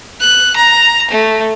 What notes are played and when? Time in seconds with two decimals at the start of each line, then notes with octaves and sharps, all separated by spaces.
0.21 F#6
0.56 A#5
1.11 A3